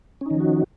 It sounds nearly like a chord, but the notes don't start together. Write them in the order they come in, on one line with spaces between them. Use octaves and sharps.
C#4 D#4 D#3 F3 F#4